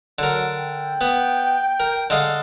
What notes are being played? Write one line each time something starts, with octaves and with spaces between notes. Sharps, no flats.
D3 F#3 A#4
G5
B3
A#4
D3 G#3 D#5 F5